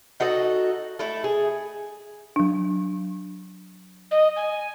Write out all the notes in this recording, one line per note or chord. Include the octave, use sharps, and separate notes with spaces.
D#4 F#4 A4 D#5
A3 E4 A4
G#4
F#3 D4
D#5
G#5